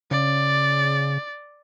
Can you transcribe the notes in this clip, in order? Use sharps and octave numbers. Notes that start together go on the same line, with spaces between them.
C#3 D5